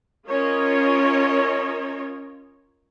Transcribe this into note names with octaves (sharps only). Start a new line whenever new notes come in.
C#4 F4 A#4 C#5 D#5